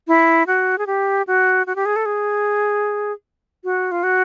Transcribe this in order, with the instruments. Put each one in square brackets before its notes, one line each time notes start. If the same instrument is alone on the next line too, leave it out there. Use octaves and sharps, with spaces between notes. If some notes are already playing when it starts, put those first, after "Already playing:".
[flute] E4
F#4
G#4
G4
F#4
F#4
G4
G#4
A4
G#4
F#4
F4
F#4